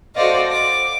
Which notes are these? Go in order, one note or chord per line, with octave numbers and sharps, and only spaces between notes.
F#4 A4 C5 D5 D#5 F5
D6